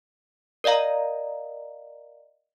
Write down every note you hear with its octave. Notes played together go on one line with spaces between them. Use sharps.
A#4 D5 D#5 F5 A#5